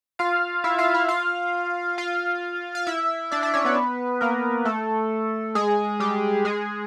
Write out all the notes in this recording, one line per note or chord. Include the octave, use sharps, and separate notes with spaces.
F4 F5
E4 E5
F4 F5
E4 E5
F4 F5
F4 F5
F5
E4 E5
D4 D5
D4 D5
C#4 C#5
B3 B4
A#3 A#4
A3 A4
G#3 G#4
G3 G4
G#3 G#4